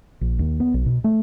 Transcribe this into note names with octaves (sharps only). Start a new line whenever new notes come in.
A#1
D#2
B3
B1
B2
A3